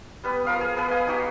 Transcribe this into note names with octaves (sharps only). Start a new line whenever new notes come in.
G3 B3 B4
F3 A#4 F5 D#6
G#4
B3 G#4 B4
D#5 F5 G#5 D#6
D#4 F#4 G4